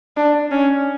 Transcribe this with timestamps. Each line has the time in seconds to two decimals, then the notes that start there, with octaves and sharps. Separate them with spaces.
0.17 D4
0.51 C#4